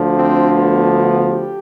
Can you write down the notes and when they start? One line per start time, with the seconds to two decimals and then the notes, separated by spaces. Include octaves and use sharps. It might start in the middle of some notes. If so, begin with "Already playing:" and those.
Already playing: D2 D3 F3
0.16 C4
0.53 B3
0.90 B3
1.27 G4